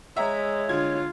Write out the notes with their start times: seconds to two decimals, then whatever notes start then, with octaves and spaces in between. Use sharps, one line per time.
0.17 G#3 C#5 E5 A#5
0.69 D3 F4 G#6